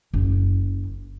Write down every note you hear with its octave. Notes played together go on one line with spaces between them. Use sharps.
F#1